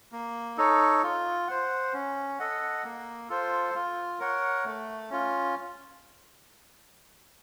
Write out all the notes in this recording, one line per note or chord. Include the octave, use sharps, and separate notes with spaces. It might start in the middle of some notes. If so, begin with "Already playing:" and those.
A#3
D#4 A4 C#5
F4
C5 F#5
C#4
A4 D#5 F#5
A#3
F4 A4 C5
F4
A#4 C#5 F#5
A3
C#4 F4